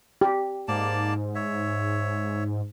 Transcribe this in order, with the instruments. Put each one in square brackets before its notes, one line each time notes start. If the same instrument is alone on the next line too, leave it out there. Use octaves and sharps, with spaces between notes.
[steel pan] G4
[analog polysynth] G#2 [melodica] A#3 D5 A5
[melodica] C#5 E5